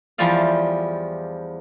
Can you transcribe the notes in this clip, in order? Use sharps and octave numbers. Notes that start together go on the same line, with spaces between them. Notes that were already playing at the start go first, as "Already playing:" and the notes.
E2 F3 G3 F4 D5 F5